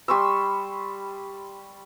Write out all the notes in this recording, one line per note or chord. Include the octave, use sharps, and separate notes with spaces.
G3 C6 C#6 E6